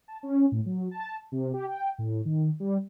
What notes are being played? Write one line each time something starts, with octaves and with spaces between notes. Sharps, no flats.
A5
C#4
A2
F#3
A5
C3
G4
G5
A2
D#3
G3